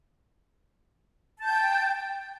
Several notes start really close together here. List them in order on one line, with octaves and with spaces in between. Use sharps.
A5 G6 G5